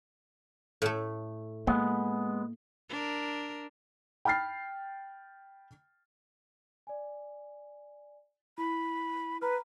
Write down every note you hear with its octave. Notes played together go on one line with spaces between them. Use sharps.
A2 A3
G#3 A#3 B3
D4 A#4
G5 B5 F6 A6 C7
D5 G#5
E4 B5
B4 A#5 B5 F6